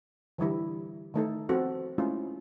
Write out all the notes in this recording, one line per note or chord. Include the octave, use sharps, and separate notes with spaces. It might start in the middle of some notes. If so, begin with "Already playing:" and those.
D3 E3 G3 E4
D#3 A3 D#4 A4
F3 B3 C4 F#4 A4
G#3 A3 C#4 E4 F4